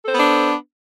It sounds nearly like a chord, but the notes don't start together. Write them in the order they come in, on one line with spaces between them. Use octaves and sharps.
A4 C5 B3 D4